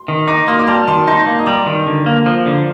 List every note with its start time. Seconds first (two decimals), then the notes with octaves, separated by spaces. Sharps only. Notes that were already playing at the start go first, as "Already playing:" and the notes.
Already playing: C6
0.08 D#3
0.27 D#4 A#5 D6
0.47 A#3 C6 D#6
0.59 D6
0.67 G3 A5 C6
0.87 D#3 A5 C6
1.07 D#4 A5 C6
1.26 A#3
1.39 D#6
1.46 G3 A#5 D6
1.66 D#3
1.87 D3
2.06 A#3
2.26 F3
2.46 D3